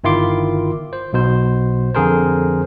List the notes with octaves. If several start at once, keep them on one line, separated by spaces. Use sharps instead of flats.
G1 D#3 E4 F4 C6 D6
C5
B1 B2 C5
F2 D3 G#4 A#4 C5